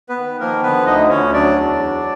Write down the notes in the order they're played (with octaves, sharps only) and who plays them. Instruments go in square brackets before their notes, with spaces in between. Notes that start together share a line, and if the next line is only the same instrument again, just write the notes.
[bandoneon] B3 B4
D#3
F3 A#3 A#4
D3 B3 B4
D2 D#4 D#5
D2 C#4 C#5
F#3 D4 D5
E2
F#3